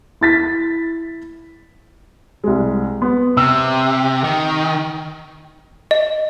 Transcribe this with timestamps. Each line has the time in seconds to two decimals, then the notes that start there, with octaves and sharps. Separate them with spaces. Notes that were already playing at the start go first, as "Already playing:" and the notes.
0.21 E4 A6 B6
2.44 C2 G#3
3.02 B3
3.37 C3 E6
4.24 D#3
5.91 D#5